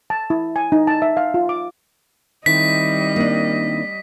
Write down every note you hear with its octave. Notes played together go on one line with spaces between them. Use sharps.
A5
E4
G#5
D#4
A5
E5
F5
F4
D6
D#3 G3 C4 E4 D#5 B6
A#3 D4